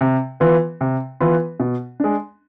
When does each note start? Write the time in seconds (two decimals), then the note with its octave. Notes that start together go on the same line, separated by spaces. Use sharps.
0.01 C3
0.40 E3 B3 F4 B4
0.81 C3
1.20 E3 B3 F4 B4
1.60 B2
2.00 G#3 D4